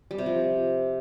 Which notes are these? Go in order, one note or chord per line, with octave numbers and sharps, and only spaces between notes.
G3
C3
F3